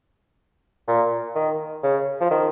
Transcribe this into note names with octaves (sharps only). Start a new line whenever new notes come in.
A#2
D#3
C#3
F3
D#3